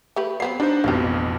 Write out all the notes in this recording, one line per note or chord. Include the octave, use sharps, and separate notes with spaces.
A3 G4 B4
F#3 B3 C4 C7
G3 D4 D#4 C5
A1 F2 B2 A#3 G4